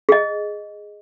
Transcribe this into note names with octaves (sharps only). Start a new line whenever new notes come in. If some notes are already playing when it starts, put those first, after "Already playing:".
G#4 D#5